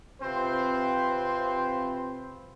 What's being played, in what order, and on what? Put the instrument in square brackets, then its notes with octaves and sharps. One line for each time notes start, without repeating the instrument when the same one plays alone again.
[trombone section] C3 C4 F4 B4 C5